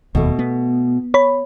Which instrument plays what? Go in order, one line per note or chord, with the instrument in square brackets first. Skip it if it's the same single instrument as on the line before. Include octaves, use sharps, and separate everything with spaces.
[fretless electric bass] E1 D#2 [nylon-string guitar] B2 A3
[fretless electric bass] B3
[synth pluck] C#5 B5